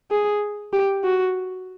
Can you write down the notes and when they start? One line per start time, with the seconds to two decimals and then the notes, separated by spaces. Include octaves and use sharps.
0.11 G#4
0.73 G4
1.04 F#4